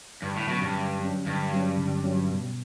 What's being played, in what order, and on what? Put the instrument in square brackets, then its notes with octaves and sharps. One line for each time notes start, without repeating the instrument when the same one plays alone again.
[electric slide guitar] G2 [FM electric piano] D3
[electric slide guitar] A2
[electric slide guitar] B2 [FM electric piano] F#3 C#4
[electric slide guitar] G2
[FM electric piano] D3
F#3 C#4
[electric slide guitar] G2 [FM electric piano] D3
[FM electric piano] F#3 C#4
D3
F#3 C#4
B2